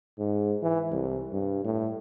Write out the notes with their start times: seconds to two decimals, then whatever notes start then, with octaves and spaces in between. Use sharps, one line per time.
0.19 G#2
0.63 E3
0.92 C2
1.33 G2
1.64 A2